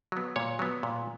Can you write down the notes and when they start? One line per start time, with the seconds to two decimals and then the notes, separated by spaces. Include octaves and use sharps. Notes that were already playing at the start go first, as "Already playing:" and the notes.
0.12 F#3 B3
0.36 A#2 C#5
0.59 F#3 B3
0.83 A#2